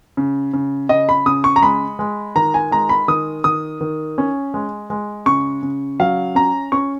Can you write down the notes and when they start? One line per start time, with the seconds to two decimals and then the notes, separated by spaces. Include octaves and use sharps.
0.17 C#3
0.54 C#3
0.89 C#3 D#5
1.09 B5
1.26 C#3 D#6
1.44 C#6
1.56 A#5
1.62 G#3 B5
1.99 G#3
2.36 D#3 A#5
2.54 G#5
2.71 G#3 A#5
2.89 B5
3.08 D#3 D#6
3.44 D#3 D#6
3.81 D#3
4.18 C#4
4.54 G#3
4.90 G#3
5.26 C#3 C#6
5.63 C#3
6.00 F#3 F5
6.35 C#4 A#5
6.72 C#4 C#6